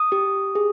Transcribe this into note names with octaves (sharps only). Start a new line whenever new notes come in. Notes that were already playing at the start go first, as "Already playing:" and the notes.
Already playing: D#6
G4
G#4